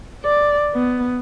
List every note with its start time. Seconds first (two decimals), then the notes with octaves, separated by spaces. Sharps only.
0.23 D5
0.74 B3